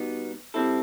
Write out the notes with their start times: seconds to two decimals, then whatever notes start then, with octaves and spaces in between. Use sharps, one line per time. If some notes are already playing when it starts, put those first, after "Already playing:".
Already playing: B2 G3 B3 D#4
0.54 G3 C4 E4 A4